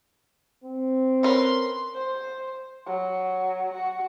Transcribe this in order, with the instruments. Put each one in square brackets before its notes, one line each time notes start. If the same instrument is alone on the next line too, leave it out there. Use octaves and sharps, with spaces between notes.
[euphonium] C4
[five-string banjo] C#4 A#4 B4 [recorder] C6
[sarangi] C5
F#3
F#4